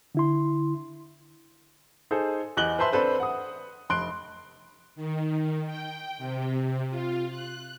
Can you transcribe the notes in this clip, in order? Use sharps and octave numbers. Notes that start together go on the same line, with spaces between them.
D3 E4 C6
D#4 G#4 A4 C5
E2 D#5 F#6 F#7 G7
B4 C5 E5 A5 C6
C4 D4 A4 B4 C5
F#5 D#6
F1 C6 F#6 D7
D#3
G5
C3
F4
F#6